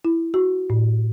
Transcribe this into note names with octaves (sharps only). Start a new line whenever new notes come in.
E4
F#4
A2